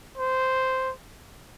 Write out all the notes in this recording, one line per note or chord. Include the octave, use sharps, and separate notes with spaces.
C5